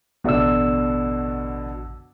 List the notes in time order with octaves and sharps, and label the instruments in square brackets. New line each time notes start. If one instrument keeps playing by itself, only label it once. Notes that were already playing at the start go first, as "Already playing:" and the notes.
[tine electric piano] A1 E6 [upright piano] B2 D3 D4